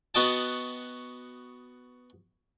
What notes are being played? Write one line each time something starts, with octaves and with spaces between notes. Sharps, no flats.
B3 F#4 D#5 G5 A5